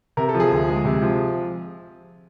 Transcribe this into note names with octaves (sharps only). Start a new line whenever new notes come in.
C3 A#4
A4
F3
G#4
D2
G#3
C3
F3